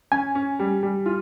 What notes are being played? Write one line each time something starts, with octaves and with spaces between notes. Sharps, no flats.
C#4 G#5
C#4
G3
G3
F4